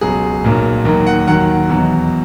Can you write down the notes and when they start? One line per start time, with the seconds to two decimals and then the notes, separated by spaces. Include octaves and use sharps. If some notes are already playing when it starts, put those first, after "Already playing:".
0.01 C#2 B2 F#3 G#4
0.44 B1 A#2 F#3
0.85 D#2 D#3 F#3
1.07 F#5
1.27 D#2 D#3 F#3 F#5
1.69 E2 B2 F#3